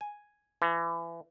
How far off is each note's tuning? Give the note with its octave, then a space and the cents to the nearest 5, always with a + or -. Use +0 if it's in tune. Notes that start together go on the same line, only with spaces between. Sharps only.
G#5 +0
E3 +30